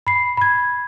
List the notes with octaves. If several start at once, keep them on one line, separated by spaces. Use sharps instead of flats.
B5 C7
B5 G#6